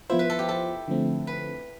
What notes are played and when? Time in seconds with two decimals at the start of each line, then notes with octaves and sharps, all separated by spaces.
0.09 F3 B3 E4 F4 C5
0.19 B4
0.30 A4
0.39 G4
0.49 A4
0.88 D3 F3 A3 C4
1.27 B4